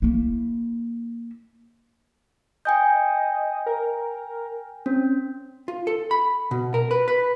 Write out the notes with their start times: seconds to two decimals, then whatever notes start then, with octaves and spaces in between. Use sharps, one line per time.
0.02 A#3 E4
2.65 D#5 G5 G#5 G6
3.66 A#4
4.86 C4 C#4
5.68 F4
5.87 A4
6.11 B5
6.51 B2
6.74 A#4
6.91 B4
7.08 B4